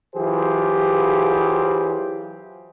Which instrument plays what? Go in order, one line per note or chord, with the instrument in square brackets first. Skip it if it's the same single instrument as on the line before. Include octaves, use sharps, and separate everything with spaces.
[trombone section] E3 F#3 F4 G4 G#4 C5